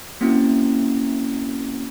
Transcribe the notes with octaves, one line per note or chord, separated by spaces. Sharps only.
A#3 C4 C#4 E4 F#4